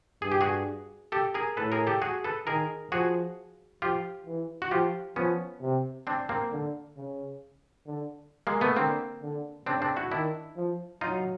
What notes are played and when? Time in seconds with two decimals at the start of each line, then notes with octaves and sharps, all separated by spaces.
0.22 G2 G#4
0.32 G4
0.41 F#4 G#4
1.12 G4 A4
1.34 G#4 A#4
1.57 A2 A4 B4
1.72 G#4 A#4
1.87 G4 A4
2.02 F#4 G#4
2.24 A4 B4
2.47 D#3 G#4 A#4
2.92 F3 F#4 G#4
3.82 F3 F4 G4
4.26 E3
4.62 F#4
4.71 F3 F4 G4
5.16 F3 B3 C#4
5.62 C3
6.07 C4 D4
6.29 A#3 C4
6.52 D3
6.97 C#3
7.86 D3
8.47 G#3 A#3
8.61 A3 B3
8.76 D3 A#3 C4
9.22 D3
9.66 C#3 C4 D4
9.82 C4 D4
9.96 E4 F#4
10.11 D#3 D4 E4
10.56 F3
11.01 F#3 D#4 F4